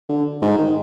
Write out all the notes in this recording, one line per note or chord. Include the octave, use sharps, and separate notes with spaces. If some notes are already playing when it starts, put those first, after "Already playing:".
D3
G#2
D#3